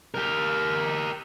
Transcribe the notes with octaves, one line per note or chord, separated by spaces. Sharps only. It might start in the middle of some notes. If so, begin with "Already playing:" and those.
G4 A#4